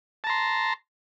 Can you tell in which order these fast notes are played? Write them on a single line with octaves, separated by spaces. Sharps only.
A5 A#5 C6